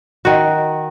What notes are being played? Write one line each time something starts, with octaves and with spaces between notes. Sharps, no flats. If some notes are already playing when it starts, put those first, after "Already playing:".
D#3 F#4